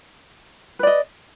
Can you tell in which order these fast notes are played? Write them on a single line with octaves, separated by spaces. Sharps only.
B4 D5 D#5